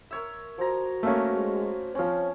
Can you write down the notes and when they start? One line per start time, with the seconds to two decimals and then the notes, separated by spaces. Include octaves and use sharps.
0.11 A#4 C#5 E5
0.58 F3 F#4 A#5
1.03 A3 A#3 C#4
1.33 G#3
1.95 F3 C4 C#4 C#5